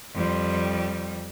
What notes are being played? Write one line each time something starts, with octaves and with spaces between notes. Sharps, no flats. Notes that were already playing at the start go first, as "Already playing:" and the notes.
F2 G3